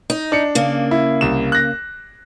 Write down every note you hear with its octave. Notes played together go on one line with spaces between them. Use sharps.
D#4
D4 C#7
C#3 A#3
E4
C2 E7
F#6 A#6